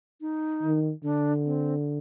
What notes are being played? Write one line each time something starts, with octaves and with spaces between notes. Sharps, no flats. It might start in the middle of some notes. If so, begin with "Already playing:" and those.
D#4
D#3
D3 D4
C4